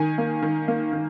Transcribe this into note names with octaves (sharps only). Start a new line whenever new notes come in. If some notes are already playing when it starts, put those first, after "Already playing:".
Already playing: D#3 G#5
A#3
D#3
A#3
D#3